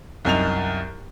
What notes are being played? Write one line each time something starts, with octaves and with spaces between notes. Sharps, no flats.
C2 F#2 D#4 F7